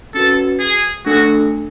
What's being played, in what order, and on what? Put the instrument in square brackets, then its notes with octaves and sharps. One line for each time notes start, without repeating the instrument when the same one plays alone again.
[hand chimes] C#4 F#4 B4 [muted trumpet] A4
[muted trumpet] G#4
[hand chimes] A3 D4 A4 [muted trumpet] F#4